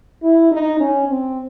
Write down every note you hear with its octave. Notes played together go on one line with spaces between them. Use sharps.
E4
D#4
C#4
C4